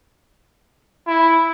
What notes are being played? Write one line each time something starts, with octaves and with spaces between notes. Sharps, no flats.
E4